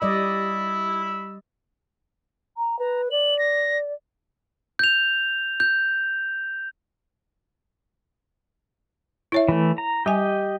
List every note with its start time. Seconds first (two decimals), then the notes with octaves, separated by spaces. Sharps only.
0.02 G3 D5 D#5 B5 E6
2.57 A#5
2.79 B4 A#5
3.11 D5 F#7
3.39 A#6
4.79 G6 F7
5.60 G6
9.32 E4 C#5 E5
9.48 E3 A3
9.78 A#5
10.06 G3 G4 D#5 G#5